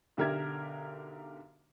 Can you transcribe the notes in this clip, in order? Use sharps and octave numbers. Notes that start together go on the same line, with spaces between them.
B1 D3 G4 A#4 E5 G#6